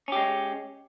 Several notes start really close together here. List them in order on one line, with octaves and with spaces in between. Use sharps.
C#4 G4 G#3